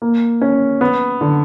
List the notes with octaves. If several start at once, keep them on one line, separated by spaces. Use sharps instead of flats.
A#3
C#4
B3
D3